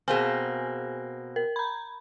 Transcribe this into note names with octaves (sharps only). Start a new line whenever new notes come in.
B2 A#3 C4 G#4 G#5
A#4
A#5 B5